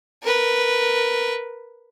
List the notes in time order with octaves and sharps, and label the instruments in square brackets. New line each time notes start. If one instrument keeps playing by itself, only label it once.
[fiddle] A#4 B4